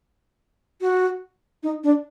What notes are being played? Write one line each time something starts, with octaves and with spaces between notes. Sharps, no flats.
F#4
D#4
D4